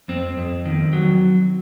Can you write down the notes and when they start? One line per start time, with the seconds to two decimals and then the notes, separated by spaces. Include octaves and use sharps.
0.08 F2 C4
0.37 F2
0.65 D#3
0.93 F#3